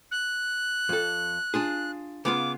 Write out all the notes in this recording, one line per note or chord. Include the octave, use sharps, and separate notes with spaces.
F#6
F2 A4
D4 F4 G#4
C#3 B3 F4 D6